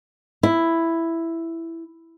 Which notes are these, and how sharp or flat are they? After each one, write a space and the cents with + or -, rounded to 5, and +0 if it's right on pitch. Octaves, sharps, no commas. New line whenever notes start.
E4 +5